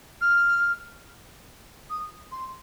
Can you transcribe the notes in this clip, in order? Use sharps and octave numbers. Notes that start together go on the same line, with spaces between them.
F6
D#6
C6